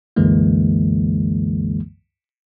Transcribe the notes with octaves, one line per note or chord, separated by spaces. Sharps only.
C2 F#2 D3 E3 G#3 A#3